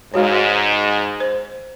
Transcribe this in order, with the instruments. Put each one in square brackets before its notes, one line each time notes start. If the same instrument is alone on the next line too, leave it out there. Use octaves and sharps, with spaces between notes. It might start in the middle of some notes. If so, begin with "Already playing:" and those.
[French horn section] G#2 [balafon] G#3 F#4 C#5
[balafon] C5